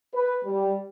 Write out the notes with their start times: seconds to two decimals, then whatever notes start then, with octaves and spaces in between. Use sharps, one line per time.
0.14 B4
0.45 G3